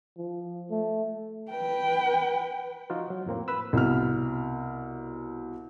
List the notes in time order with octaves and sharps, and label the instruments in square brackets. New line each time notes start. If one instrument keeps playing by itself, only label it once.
[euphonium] F3
A3
[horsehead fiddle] B4 G5
[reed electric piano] F3 D#4 F4 F#4
F#3
F2 A2 A#3 C4
B4 B5 E6
[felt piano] C2 B2 F6